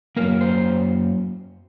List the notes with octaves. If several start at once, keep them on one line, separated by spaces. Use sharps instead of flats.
F#2 D#3 F#3 A#3 A#4
C5